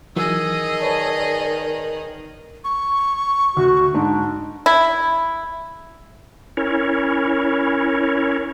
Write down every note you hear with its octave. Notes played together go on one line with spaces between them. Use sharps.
D#3 E3 F#3 G#4 D#5 E6
B4 C#5 D5 A5
C#6
D2 F#4
G#2 D4
E4
C#4 E4 A#4 C#5